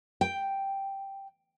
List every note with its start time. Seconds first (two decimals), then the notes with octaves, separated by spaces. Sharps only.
0.21 G5